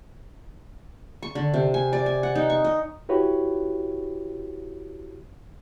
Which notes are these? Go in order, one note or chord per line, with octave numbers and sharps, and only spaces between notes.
C#6
D3
C3
G#5
D5
G#5
F#5
D#4
C#6
D#5
E4 F#4 G4 B4 C#5